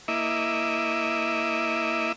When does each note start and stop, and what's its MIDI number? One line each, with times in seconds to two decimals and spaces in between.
0.08 2.12 58
0.08 2.12 64
0.08 2.12 75
0.08 2.12 76
0.08 2.12 86